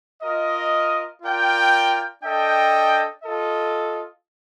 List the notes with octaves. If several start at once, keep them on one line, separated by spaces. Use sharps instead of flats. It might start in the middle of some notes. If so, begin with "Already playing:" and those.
F4 A#4 D#5
F4 A#4 D5 G5
D4 A4 D#5 G5
F4 A4 D#5